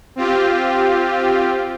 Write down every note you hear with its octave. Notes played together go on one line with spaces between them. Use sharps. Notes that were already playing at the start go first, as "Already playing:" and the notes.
C4 F4 G4